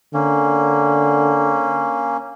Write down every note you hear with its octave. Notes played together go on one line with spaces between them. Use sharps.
D3 A#3 C#4